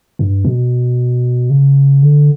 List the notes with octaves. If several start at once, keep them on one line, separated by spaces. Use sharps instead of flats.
G2
B2
C#3
D3